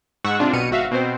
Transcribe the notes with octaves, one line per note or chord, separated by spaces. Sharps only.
G#2 F#5 C#6 E6 F#6
C3 C4 D4 F4
B1 B2 F6 C#7 D#7
G#1 F#4 E5 F5
B2 C4 C5